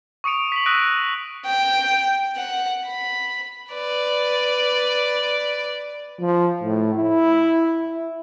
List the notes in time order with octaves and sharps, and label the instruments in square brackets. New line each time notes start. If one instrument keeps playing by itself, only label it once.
[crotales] C#6 D#6 C#7 D7 F7
B6 F#7
D#6 E6 F#6 A#6 D7 D#7
[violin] G5
F#5
B5
[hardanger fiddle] B4 D5
[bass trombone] F3
A2
E4